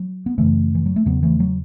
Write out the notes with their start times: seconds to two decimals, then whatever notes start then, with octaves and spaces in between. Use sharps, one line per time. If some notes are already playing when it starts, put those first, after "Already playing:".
Already playing: F#3
0.26 B3
0.38 F#2 C#3 E3 A3
0.75 E3
0.86 F#3
0.96 A3
1.06 E2 C#3 F#3 B3
1.23 E3 A3
1.40 F#3